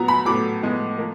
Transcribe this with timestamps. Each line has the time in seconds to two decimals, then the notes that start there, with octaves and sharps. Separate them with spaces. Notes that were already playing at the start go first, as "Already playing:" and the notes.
Already playing: A#2 F#3 B3 A#5
0.08 B5
0.25 A2 F#3 B3 D6
0.62 A2 F3 G#3 B3
0.98 F3 A#3